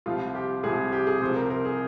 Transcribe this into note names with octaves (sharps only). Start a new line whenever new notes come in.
C2 C3 F3 F4
G4
C2 C3 F3 G#4
G4
G#4
C2 C3 F3 C5
A#4
A#4
G#4